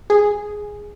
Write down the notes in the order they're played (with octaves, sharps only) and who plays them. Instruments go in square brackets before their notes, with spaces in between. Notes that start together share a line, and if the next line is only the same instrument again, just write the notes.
[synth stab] G#4